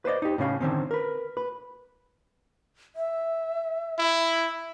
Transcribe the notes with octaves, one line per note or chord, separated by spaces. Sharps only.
B4 C5 D5 D#5
D#4 G4
A2 C#3 C#4 F5
D3 D#3 C4 C#4
A#4 B4
B4
E5
E4